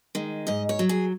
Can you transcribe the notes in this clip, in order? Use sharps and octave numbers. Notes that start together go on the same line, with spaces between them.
D#3 G#3
G#2 D#5
C#5
F#3
G#4